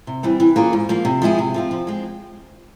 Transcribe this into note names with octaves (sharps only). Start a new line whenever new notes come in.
C3
E3 G3 C4
E3
A#3 C#4 F4 G#4
G#2
F3 A#3
C3
F3 G#3 E4 G#4
C3
F3 C4 F4
F3
G#3 C4